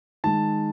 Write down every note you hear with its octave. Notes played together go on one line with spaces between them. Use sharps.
D#3 G#3 A5